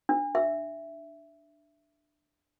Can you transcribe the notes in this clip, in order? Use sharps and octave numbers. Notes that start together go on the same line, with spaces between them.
D4
E5